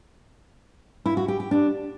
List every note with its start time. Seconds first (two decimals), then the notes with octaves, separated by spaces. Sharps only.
1.06 E4
1.17 F#4
1.28 G4
1.40 G4
1.51 D4